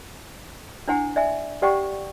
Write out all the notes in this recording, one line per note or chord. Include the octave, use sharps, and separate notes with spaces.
D4 E4 C5 F#5 G#5
D5 E5 G#5
G4 C5 D5 F#5 G5 C#6